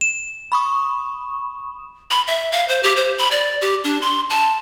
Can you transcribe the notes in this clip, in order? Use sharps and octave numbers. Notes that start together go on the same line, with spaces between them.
E7
B5 C#6 D#6
B5
E5
F5
C5
G4
C5
B5
D5
G4
D4
C6
A5